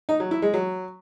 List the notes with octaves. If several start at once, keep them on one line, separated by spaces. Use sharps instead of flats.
D#4
F#3
E4
G#3
F#3